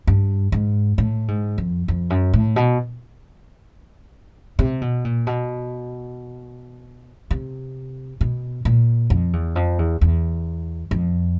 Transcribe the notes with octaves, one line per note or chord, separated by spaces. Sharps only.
G2
G#2
A2
G#2
F2
F2
F#2
A2
B2
C3
B2
A#2
B2
C3
B2
A#2
F2
E2
F2
E2
E2
F2